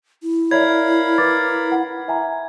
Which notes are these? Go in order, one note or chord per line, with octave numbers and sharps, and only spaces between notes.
E4
A#4 C#5 D5 E5 F5 B5 G#6
B4 D6 A6
F#5
E5 G#5 A#5